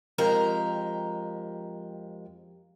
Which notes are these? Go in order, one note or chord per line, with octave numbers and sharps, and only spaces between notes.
F2 G#3 G4 A#4 A#5